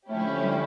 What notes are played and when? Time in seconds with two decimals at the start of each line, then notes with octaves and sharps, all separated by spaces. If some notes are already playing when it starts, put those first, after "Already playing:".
0.09 D3 F3 A3 C#4 E4 G4
0.43 G3